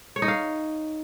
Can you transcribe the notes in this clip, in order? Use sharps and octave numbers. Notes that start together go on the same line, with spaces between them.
C#5
D#4
F5